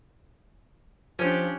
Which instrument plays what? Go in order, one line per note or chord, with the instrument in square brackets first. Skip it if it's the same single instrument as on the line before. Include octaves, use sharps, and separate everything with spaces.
[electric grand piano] F3 [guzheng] C#4 [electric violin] D4 G4